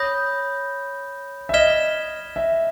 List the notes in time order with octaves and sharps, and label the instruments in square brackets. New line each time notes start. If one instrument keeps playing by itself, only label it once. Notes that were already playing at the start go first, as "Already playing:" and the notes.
Already playing: [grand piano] C#5 [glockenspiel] B5 D#6 G6 A#6
[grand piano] E5
[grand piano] D#5 [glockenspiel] F6 G#6 B6 E7 G7
[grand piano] E5